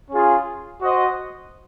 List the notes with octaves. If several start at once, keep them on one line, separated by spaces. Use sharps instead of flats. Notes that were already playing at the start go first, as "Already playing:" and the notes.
C#4 F4 G#4
F#4 C5 D#5